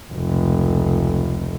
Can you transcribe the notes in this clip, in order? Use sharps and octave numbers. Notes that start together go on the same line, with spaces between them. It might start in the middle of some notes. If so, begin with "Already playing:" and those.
F1 C#2